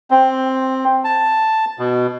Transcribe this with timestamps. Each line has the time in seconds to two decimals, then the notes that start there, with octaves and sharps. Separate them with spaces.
0.11 C4
1.04 A5
1.79 B2